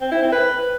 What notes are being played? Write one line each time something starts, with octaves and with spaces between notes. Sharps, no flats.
C4
E4
C4
B4